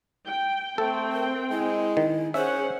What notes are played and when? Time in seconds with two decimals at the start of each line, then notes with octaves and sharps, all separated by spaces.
0.26 G5
0.78 A3 C4 A4 G5
1.13 A#4
1.50 G#3 E4
1.97 D#3
2.34 C#4 G#4 C5 E5 F#5